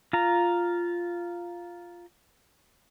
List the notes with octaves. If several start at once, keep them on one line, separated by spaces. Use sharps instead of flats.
F4 A#5